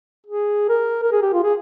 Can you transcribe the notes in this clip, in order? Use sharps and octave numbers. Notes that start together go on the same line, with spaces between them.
G#4
A#4
A#4
G#4
G4
F4
G#4